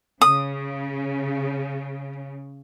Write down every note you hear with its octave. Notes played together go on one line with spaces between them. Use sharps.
C#3 D#6